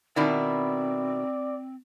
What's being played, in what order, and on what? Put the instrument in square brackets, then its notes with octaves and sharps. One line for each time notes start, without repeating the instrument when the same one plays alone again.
[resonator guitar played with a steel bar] B2 D#3 E4 [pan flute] C4 [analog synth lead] D5